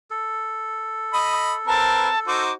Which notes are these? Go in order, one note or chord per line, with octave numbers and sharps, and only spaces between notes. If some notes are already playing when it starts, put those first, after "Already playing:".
A4
D#5 B5 D#6
C4 A#4 B4 A5
D#4 F#4 C5 D6